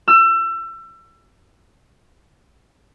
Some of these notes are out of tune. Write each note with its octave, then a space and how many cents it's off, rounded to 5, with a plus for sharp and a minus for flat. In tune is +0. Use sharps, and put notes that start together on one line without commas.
E6 +30